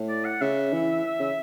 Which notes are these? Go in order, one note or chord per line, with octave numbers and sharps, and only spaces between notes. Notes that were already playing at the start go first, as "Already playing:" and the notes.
Already playing: A2
D5
F#5
C#3 E5
E3
C#3